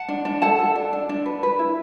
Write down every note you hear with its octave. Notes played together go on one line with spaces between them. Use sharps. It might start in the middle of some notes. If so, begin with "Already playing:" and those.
Already playing: F#5 A5
D4
D4
A4 F#5 A5
A4
D4
D4
D4
B4
B4
E4